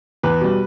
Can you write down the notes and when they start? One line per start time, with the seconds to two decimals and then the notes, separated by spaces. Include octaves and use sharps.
0.23 E2 B4
0.41 B2 G3